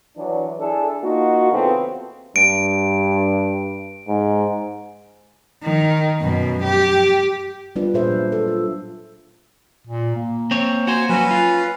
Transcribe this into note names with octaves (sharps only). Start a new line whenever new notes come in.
E3 F#3 D4
D4 E4 G#4 A4
A#3 D#4 F4 F#4
C#3 E3 B3 C4 F4 A4
G2 D7
G#2
D#3
F#2 B2
G4
G3 B3 D4 F4 B4
A#2 D4 G#4 B4 C5 E5
F#3
A4
F4
A#2
A#3
C4 C#5
F#4 C5 G#5
F#3 C#4 F#4 B4
F4